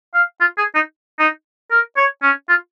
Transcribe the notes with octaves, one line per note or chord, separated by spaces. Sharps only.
F5
F4
G#4
D#4
D#4
A#4
C#5
C#4
F4